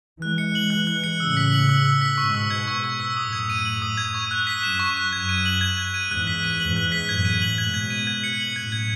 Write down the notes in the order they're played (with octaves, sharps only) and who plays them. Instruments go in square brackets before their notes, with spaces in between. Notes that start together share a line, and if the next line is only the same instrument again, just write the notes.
[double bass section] E3 G#3 [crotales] F#6
[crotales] C#7
F#7
[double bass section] E3 G#3 [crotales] F#6
[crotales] F#6
C#7
[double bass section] A2 C#3 [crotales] E6
[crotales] B6
F#7
E6
E6
B6
[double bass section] G#2 B2 [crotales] C#6
[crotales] E6
G#6
C#6
C#6
E6
[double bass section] F#2 A2 [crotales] D#6
[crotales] G#6
D#7
F#7
D#6
G#6
C#6
F#6
B6
[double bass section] F#2 [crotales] E7
[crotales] C#6
F#6
[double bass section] F#2 [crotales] G#6
[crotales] D#7
F#7
G#6
G#6
D#7
[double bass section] E2 G#2 [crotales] F#6
[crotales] B6
D#7
[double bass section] E2 G#2 [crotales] F#7
[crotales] F#6
B6
[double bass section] F#2 A2 [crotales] G#6
[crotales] D#7
F#7
[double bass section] G#2 B2 [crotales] G#6
[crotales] G#6
D#7
G#6
C#7
F#7
[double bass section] F#2 A2 [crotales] G#6
[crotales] G#6